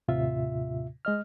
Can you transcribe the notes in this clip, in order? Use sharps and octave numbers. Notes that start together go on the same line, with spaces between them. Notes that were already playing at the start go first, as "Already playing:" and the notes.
D#2 A2 C3 F4 E5
G#3 D#5 F6